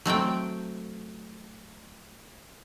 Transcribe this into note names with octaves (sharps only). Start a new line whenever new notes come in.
F#3 A3 C4 G5